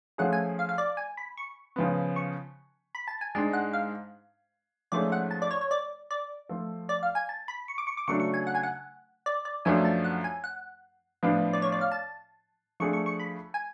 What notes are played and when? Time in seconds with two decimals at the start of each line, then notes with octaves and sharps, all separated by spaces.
0.18 F3 A3 C#4 F4 G#4 F#5
0.33 G#5
0.59 F5
0.69 F5
0.78 D5
0.97 G#5
1.17 B5
1.37 C#6
1.76 C#3 F3 B3
2.16 C#6
2.95 B5
3.08 A5
3.21 G#5
3.35 G#2 G#3 D4 A5
3.53 F#5
3.73 F5
4.92 G#2 F3 A3 C#4 G#4 D5
5.12 F#5
5.31 A5
5.42 D5
5.51 C#5
5.61 C#5
5.71 D5
6.11 D5
6.49 F3 A3 F4 A4
6.89 D5
7.03 F5
7.15 G#5
7.29 A5
7.48 B5
7.68 C#6
7.78 D6
7.87 C#6
7.97 D6
8.08 C#3 F#3 A3 D4 C#6
8.20 C#6
8.34 G#5
8.47 F#5
8.55 G#5
8.63 F#5
9.26 D5
9.45 D5
9.65 F#2 F3 A3 D4 F4 G#5
9.85 A5
10.04 F#5
10.24 G#5
10.44 F#5
11.23 A2 F3 B3 D4 F4
11.53 D5
11.62 C#5
11.72 D5
11.81 F5
11.92 A5
12.80 F3 A3 D4 G#4 C#6
12.93 C#6
13.06 C#6
13.20 B5
13.54 G#5